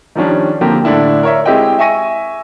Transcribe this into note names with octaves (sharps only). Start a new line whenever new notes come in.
D#3 F3 G3 C#4 D4
D3 F3 A#3 C4 G4
A2 D3 D4 E4
A#4 C#5 E5
G#3 C4 E4 G4 D#5 G5
E5 G#5 C#6 A#6 D#7